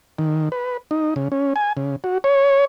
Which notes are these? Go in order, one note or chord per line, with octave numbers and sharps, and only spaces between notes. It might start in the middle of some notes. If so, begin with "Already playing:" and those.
D#3
B4
D#4
C#3
C#4
G#5
C#3
F#4
C#5